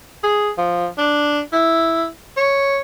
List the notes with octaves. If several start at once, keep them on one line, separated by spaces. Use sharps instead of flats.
G#4
F3
D4
E4
C#5